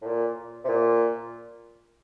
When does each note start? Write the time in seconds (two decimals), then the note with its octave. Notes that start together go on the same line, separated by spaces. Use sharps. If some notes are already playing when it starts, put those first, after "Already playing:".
0.02 A2
0.06 A#2
0.65 C3
0.69 A#2